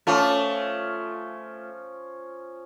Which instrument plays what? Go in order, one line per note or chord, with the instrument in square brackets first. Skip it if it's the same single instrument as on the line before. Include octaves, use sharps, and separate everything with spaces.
[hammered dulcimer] F3 C#4 D6 [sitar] A3 F4